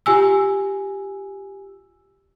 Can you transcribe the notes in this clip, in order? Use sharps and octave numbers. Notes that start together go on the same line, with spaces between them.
F4 G4 G#5 E6